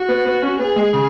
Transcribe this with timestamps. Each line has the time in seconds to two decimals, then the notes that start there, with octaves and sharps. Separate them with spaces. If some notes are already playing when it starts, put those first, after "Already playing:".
Already playing: F#4
0.09 B3
0.25 B3
0.42 C#4
0.59 B3 G#4
0.76 G#3
0.93 C#3